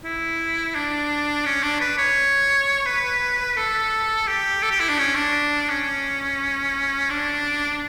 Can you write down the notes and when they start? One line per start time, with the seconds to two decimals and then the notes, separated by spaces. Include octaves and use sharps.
0.04 E4
0.75 D4
1.45 C#4
1.63 D4
1.81 B4
1.98 C#5
2.86 B4
3.57 A4
4.27 G4
4.62 A4
4.71 G4
4.80 E4
4.89 D4
4.99 C#4
5.15 D4
5.69 C#4
7.10 D4